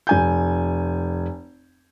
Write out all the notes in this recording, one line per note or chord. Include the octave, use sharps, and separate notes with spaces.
F1 G#5 G6